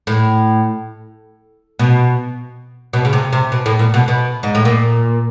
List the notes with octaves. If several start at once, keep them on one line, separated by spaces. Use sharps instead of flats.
A2
B2
B2
C#3
C3
C3
B2
A2
A#2
B2
B2
G#2
A2
A#2